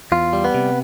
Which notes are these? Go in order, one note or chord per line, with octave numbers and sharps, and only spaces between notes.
E2 F4
G3
B3
C3